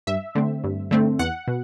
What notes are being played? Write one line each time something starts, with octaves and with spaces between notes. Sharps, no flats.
G2 E5
D3 A3 C4
G2
D3 A3 C4
E2 F#5
B2